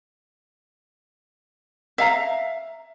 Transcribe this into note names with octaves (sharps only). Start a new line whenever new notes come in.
E5 F5 A#5